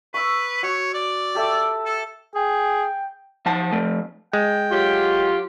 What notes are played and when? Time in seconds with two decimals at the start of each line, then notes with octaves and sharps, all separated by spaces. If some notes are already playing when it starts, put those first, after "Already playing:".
0.14 B4 C#6 E6
0.63 F#4 C#5
0.94 D5
1.35 G4 A4 E5
1.86 A4
2.35 G#4 G5
3.46 F3 F#5 A5
3.73 F3 A3
4.33 G#3 G5
4.71 F#3 F4 G4